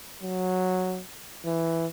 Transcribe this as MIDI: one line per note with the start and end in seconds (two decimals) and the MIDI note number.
0.23 1.01 54
1.45 1.87 52